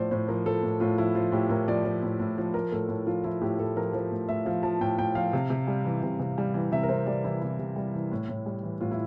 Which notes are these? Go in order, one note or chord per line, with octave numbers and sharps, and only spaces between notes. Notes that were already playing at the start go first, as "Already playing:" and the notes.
Already playing: A2 F3 C5 D5
A2 C5
F3 A#4
F3 A4
A2
A2 F4
F3 E4
F3 F4
A2 G4
A2 A#4
F3 D5
F3
A2
A2
F3
F3 A#4
A2 A4
A2
F3 F4
F3 E4
A2 G4
A2 A4
F3 A#4
F3 C5
A2
A2 E5
F3 F5
F3 A5
A2 G5
A2 G5
F3 F5
C3
C3
G3
E3
C3
C3
G3
E3
C3 E5
A#4
C3 C5
G3 D5
E3 E4
C3 E4
C3
G3
E3
A2
A2
G3
E3
A2 F4
E4